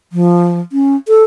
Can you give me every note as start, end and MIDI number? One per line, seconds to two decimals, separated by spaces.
0.13 0.59 53
0.72 0.96 61
1.08 1.24 69